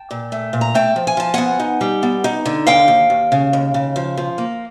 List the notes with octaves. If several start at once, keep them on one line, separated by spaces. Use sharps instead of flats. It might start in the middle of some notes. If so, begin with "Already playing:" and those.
Already playing: G5 A5
A#2
A3
A#2
A#5
A3 G5 A5
F3
G#5
F3 A5
B3 F#5 G#5
D#4
G3
B3
D#4
D3
D#2 F5 G5
D#2
D#2
C#3
D#2
C#3
F3
F3
A#3